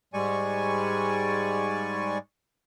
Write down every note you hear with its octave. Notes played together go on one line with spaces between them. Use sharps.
G#2 G3 G#3 D5 G#5 C#6